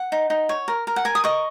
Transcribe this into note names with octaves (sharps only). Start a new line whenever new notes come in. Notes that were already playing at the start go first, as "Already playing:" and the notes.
Already playing: F#5
D#4
D#4
C#5
A#4
A#4
F#5
A#4 G#5
D#6
D#5 C#6